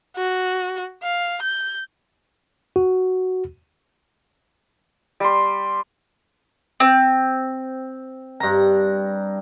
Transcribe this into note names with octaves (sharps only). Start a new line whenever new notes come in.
F#4
F5
G6
F#4
G3 C6
C4
G2 A#5